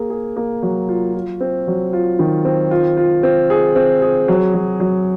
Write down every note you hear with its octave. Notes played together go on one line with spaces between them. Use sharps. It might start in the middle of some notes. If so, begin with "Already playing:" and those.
Already playing: A#3 G#4
G#4
A#3
F#3
F4
F4
C4
F#3
F4
D#3
C4
F4
F4
C4
G#4
C4
G#4
F#3
F#3
F#3